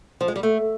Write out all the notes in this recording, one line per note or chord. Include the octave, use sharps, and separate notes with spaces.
F3
G#3
G3
A3